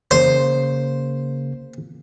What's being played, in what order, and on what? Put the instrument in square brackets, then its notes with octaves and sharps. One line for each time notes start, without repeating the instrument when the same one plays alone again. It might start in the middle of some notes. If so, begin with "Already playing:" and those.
[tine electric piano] C#3 A#3 [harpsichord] C5